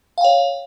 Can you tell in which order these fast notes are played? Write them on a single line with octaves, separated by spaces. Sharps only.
F5 G5 C#5